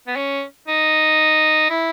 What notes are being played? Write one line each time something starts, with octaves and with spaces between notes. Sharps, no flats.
B3
C#4
D#4
E4